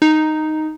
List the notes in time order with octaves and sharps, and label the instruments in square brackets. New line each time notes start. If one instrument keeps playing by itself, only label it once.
[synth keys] D#4